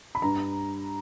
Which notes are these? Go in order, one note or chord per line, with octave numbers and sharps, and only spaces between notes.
B5
G2 A#5